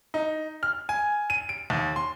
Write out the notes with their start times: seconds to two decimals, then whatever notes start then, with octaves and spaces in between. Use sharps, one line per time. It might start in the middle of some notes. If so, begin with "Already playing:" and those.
0.14 D#4
0.63 F6
0.89 G#5
1.30 D#7
1.49 D7
1.70 D#2
1.96 C6